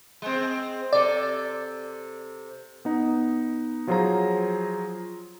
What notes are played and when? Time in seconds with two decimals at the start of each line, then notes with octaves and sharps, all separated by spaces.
0.22 G#3 C4
0.93 C3 A4 D5
2.85 B3 D#4
3.87 F3 F#3 F4 G#4 C5 A#5